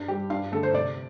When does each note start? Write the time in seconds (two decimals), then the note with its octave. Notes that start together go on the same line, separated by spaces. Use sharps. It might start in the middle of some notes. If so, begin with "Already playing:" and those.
Already playing: G2
0.08 G3 G4
0.30 G2 F5
0.52 D3 A3 A4
0.63 C5
0.74 C3 D5